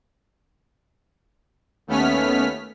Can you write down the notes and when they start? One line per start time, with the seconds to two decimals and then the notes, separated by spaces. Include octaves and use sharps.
1.87 D#2 A3 B3 C#4 F6 B6